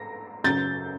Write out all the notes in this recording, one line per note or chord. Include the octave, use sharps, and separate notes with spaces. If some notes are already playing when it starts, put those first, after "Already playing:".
Already playing: A#6
F#2 C#3 F#3 G6 A6